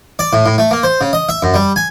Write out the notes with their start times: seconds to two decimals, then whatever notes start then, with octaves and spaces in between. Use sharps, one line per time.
0.19 D5
0.33 A2
0.46 A2
0.58 A3
0.71 A#3
0.83 C5
1.01 C#3
1.13 D#5
1.29 E5
1.42 F#2
1.54 G3
1.76 G#5